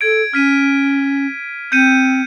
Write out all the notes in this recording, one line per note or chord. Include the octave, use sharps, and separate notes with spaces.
A4 G#6 D7
C#4 F6 B6 D#7
C4 G6 C#7 D#7